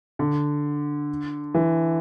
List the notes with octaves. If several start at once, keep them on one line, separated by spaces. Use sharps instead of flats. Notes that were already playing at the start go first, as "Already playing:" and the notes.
D3
E3